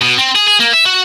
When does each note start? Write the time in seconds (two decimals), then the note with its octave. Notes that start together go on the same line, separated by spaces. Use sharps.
0.02 B2
0.18 C4
0.36 G#4
0.48 G#4
0.60 A#3
0.73 E5
0.86 F#4